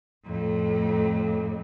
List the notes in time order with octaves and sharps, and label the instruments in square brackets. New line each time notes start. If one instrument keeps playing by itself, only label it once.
[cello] F2 A2